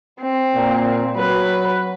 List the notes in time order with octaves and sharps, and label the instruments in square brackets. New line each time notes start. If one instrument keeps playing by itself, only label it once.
[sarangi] C4
[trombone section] A#2
[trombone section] F#3 [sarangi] B4